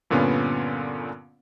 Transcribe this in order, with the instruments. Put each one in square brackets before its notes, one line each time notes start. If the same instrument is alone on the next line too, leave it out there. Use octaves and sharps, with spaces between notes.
[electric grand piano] G2 A#2 D3 B3 C#4 F4